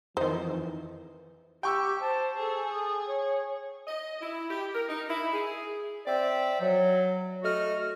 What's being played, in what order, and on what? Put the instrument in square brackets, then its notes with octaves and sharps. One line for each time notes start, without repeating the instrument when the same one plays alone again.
[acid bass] F2 [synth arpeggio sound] D#3 D#4 [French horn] E3 [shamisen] C5
[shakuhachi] G4 [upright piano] G5 C#6 E6
[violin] C5 [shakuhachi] A5
[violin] G#4 [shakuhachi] A4
[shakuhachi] D#6
C#5
[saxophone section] D#5
E4
G4
A#4
D#4
E4
G#4
[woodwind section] C4 D5 E5 G5
F#3
A3 F#4 D#5 F6